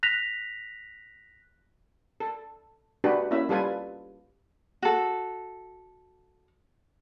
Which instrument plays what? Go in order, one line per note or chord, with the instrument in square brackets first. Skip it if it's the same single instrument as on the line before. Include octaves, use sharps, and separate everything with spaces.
[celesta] F#6 A#6 B6 F7
[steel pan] A4
A3 D4 F#4 G4 B4
A#3 C#4 E4 E5
G3 F4 A4 B4 G#5
[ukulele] F#4 A4